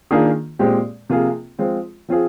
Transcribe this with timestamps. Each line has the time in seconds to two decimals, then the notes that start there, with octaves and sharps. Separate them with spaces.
0.11 D#3 A#3 D4 F4 G#4
0.59 A#2 G#3 C4 G4
1.10 C3 F3 A#3 F4 G#4
1.59 F3 G#3 C4 F4
2.08 F3 C4 F4 G#4